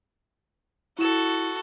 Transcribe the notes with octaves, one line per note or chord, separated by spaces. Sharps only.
E4 F#4 A4 E7